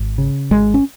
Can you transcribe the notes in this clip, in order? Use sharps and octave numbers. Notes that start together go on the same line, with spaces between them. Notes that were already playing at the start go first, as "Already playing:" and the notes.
Already playing: G#1
C#3
G#1 G#3
C#4